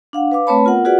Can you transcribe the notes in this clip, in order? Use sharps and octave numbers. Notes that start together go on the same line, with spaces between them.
D4 F5 F#5
B4 F5 D6
A3 C4 B4 C#5 A5 B5
B3 F4 A#4 F#5
F4 F#4 G#4 B4 D5 F#5